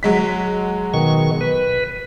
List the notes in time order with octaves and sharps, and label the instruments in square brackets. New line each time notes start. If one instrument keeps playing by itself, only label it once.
[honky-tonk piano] F#3 G#3 B6
[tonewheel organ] B2 D#3 C#6
B4